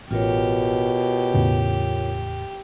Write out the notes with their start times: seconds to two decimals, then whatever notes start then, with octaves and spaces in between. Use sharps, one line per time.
0.11 A1 B2 F4 G4 A#4 C#5
1.34 E2 A2 C#3